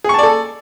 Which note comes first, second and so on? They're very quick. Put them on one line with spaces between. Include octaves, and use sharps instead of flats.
G#4 C#6 A5 D5 A4